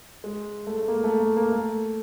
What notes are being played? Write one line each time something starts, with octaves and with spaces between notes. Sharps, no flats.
G#3
A3
A3
A#3
A3
A#3
A#3
A3